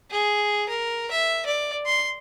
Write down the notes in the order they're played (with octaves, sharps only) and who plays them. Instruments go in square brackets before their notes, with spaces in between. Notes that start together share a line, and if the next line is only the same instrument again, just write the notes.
[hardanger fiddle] G#4
A#4
E5
D5
C6